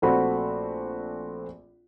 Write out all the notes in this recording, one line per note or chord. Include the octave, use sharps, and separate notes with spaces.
A#1 A3 C4 F#4 B5